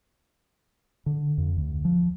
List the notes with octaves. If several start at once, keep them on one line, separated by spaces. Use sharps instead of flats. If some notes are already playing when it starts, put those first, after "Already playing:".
D3
F2
D2
F3